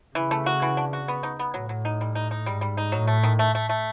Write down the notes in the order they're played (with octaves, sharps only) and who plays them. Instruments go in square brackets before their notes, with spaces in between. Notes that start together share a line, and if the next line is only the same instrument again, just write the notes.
[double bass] C#3 [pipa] E3
[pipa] A3
F#4
E3
D4
F#4
B3
D#4
B3
[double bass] A2 [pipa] F#3
[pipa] F#3
D#4
G3
D#4
D#4
[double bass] G#2 [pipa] G3
[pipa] G3
D#4
[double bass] A2 [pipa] F#3
[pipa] A3
D#3
A3
A3
A3